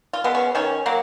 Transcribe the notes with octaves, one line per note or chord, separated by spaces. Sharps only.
F4
G#3 B3
C#4
D#3 C#4
F#3 A#3